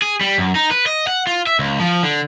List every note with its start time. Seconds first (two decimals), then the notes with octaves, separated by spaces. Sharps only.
0.02 G#4
0.21 G3
0.38 F#2
0.55 D#4
0.71 B4
0.86 D#5
1.07 F#5
1.27 F4
1.47 E5
1.59 C#2
1.80 F3
2.03 D3